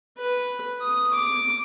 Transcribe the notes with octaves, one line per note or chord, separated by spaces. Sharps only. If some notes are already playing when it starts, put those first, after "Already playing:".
B4
D#6
D6